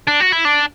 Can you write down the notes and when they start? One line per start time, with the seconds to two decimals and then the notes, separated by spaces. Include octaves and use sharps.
0.07 D4
0.20 F#4
0.32 E4
0.45 D4